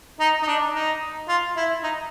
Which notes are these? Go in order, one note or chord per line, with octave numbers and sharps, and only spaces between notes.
D#4
D#4
D4
D#4
F4
E4
D#4